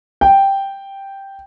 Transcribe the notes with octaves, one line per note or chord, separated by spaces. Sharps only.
G5